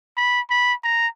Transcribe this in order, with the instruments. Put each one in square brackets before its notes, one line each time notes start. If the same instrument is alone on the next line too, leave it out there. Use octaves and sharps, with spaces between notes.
[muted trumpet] B5
B5
A#5